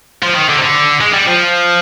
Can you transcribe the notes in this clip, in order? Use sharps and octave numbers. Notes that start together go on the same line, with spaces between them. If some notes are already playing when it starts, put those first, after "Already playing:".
F3
D#3
D3
C3
D3
G#3
G3
F3